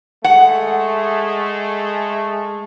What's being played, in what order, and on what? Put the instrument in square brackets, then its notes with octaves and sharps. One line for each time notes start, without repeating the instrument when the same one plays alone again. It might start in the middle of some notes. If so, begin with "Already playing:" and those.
[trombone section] G#3 A3 [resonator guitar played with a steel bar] F#5